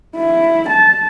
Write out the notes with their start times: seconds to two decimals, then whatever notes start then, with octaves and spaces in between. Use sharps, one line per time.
0.16 E4
0.69 A5